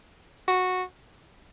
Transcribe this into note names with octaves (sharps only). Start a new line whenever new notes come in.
F#4